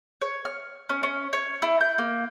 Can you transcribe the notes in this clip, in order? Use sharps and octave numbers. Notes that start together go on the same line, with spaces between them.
C#5
F6
C#4
C#4
C#5
E4
G6
A#3